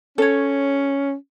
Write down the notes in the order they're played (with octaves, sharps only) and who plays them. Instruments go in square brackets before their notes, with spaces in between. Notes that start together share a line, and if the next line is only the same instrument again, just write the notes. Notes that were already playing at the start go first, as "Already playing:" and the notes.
[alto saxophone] C#4 [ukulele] A4 C#5